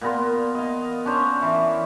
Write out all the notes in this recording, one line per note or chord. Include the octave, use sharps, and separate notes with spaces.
A#2 B3 A#4 C6
D#5 F5
C#4 D4 C5 C#5
E3 E4